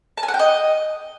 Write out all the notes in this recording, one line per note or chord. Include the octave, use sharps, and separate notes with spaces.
A5
G#5
F#5
G5
D#5